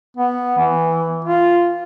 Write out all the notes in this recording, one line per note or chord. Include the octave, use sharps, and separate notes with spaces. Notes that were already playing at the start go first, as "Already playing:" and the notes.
B3
E3
F4